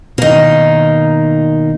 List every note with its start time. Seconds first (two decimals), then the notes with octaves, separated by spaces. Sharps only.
0.18 B2 D#3 A#3 D#4